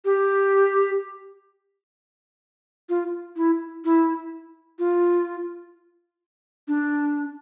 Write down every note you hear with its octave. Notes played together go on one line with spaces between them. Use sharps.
G4
F4
E4
E4
F4
D4